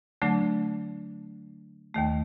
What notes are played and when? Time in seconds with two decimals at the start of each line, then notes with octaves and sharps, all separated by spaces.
0.22 D3 F#3 A3 D4 A5
1.94 D#2 D#3 A3